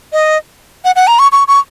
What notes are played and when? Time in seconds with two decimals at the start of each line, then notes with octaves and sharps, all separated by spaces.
0.13 D#5
0.85 F#5
0.96 F#5
1.07 A#5
1.19 C#6
1.32 C#6
1.48 C#6